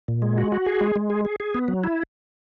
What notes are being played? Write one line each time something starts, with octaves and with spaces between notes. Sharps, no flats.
A#2
G#3
F#4
F#4
G#4
G#3
G#3
G#4
G#4
G#4
B3
F#3
E4